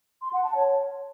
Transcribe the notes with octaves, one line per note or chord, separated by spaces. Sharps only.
C6
F#5
A5
C#5